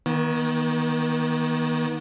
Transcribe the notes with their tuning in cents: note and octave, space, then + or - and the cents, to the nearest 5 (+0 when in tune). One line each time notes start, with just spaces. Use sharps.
D#3 +20 B3 -40